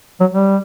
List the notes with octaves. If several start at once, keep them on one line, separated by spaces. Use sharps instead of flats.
F#3
G3